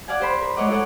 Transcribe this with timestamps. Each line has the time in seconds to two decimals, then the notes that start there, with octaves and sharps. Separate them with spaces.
0.08 D5 F5 F#5 G#5
0.19 G4 C5 B5
0.41 A#4 B5
0.56 G#3 C#5 D#5 F#5 D6
0.68 E4 A4 C#5 D#5 F#5